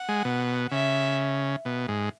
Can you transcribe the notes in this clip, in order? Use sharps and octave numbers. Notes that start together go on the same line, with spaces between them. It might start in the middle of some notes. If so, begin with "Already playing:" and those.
Already playing: F#5
G#3
B2
C#3 E5
B2
G#2